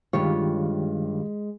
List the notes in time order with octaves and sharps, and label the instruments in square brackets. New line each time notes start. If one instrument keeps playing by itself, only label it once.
[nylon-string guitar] G2 F4 C#5 [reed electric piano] D#3 G4 F5 [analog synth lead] G#3